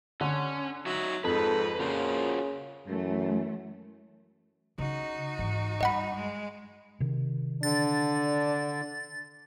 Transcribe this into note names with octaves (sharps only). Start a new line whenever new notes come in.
D3 C#4
F#3 D#4 F#4 E5
F2 G#2 A4 B4
A#2 C#3 F4 F#4 C5
F#2 E3 A3
C#3 D#4 F#4
G#2 E3
G2 D#5 F#5 B5
G#3
C3 D#3
D3 D4 A6